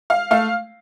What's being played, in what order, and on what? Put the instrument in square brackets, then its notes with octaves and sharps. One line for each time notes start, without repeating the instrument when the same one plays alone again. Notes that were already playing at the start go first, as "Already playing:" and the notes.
[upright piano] F5
A3 F5